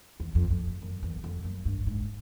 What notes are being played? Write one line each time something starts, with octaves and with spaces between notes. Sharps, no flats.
E2
F2
F2
F#2
E2
F2
F#2
G2
G#2